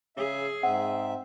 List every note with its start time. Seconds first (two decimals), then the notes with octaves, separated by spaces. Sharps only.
0.17 C#3 G#4 E5
0.63 G#2 C4 E5 F#5